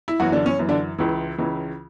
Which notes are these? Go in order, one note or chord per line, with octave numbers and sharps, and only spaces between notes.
E4
F#2 E3 F#3 F#4
D3 D4
C#4
F#2 E3
D3 D4
C#2 C#3 E3 E4
C#2 C#3 E3